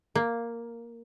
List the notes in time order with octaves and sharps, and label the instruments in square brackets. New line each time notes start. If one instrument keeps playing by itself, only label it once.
[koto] A#3